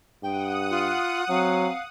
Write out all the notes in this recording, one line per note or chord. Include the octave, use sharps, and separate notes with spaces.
G2 F#5 G5 D#6
F4
F#3 C4 F5